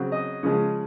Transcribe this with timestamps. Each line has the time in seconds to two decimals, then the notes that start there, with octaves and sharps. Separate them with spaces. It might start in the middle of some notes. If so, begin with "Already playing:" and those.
Already playing: C#3 F#3 C4
0.12 D#5
0.43 C#3 F3 G#3